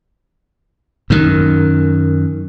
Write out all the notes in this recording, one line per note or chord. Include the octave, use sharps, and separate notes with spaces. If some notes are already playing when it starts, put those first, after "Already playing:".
F#2 D#3